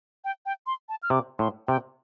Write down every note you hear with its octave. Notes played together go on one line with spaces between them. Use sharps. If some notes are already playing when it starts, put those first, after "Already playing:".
G5
G5
C6
A5
F6
C3 D6
A2 C6
C3 G5